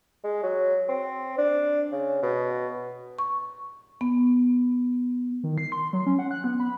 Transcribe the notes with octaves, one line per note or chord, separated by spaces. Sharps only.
G#3
F#3
C4
D4
C#3
B2
C#6
B3
D#3
C7
C6
F#3
C#4
F#5
F#6
B3
B5